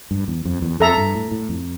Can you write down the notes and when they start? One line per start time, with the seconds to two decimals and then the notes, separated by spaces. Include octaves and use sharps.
0.11 G2
0.28 E2
0.45 F2
0.62 E2
0.80 F2 A4 E5 A#5
0.97 G2
1.15 A2
1.32 A2
1.49 F2